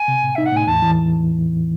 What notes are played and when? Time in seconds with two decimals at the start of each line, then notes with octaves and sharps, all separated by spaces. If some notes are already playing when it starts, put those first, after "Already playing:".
Already playing: G#5
0.08 C3
0.22 A2
0.35 D#4 E5
0.45 F#5
0.52 A2 G#5
0.67 E2 A5
0.82 E3